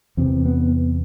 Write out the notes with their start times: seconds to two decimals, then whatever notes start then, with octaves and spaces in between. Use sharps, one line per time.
0.17 E2 C3 C4
0.45 B3